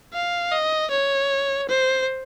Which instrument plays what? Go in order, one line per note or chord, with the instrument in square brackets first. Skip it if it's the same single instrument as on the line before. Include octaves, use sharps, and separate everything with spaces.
[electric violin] F5
D#5
C#5
C5